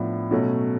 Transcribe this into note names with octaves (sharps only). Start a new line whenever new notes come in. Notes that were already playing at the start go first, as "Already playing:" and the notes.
Already playing: A2 F3 B3 D4
B2 F#3 A3 C#4